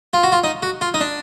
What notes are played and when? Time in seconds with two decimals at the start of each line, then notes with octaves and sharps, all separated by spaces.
0.13 F4
0.23 F#4
0.32 F4
0.44 D#4
0.63 F#4
0.81 F4
0.94 D#4
1.01 D4